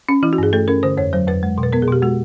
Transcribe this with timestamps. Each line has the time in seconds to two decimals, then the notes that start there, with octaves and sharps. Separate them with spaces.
0.09 C#4
0.23 E3 E4
0.33 F#4
0.38 G2 G#4
0.53 A3 A4
0.68 C#4 A#4
0.83 D3 C5
0.97 F2 C#5
1.13 F#3 C5
1.27 F2 B4
1.43 G#3
1.58 B2
1.63 B4
1.73 B3 A#4
1.82 G#4
1.87 B2 G4
2.02 G#3 F#4